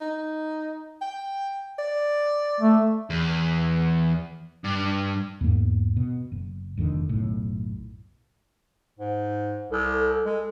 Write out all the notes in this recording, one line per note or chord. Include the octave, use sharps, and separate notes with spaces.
D#4
G5
D5
A3
E2
G2
E2 G#2 A#3
B2
F#1
F1 F2 D3 D#3
F#1 B1 A2
G#2
C2 A4
G#3 A4